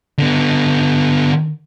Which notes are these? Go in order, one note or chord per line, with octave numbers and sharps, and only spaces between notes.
D3 B3